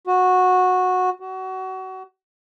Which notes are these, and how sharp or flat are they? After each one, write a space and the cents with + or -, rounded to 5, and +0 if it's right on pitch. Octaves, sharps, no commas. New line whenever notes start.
F#4 -10
F#4 +25